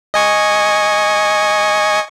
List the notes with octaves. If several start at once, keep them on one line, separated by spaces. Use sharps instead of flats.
D#5 G#5 C#6